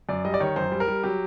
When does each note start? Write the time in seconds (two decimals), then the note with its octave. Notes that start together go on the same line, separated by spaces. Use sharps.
0.09 F#2 D5
0.25 G3 D#5
0.34 D5
0.40 D#3 C#5
0.56 F#2 C5
0.72 G3
0.80 A#4
0.88 G3
1.03 F#3 G4